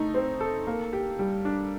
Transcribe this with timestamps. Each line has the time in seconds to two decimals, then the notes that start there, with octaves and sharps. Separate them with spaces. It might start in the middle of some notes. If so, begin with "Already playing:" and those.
Already playing: A3 D#4
0.14 C4
0.41 A4
0.67 A#3
0.93 G4
1.19 G3
1.45 D4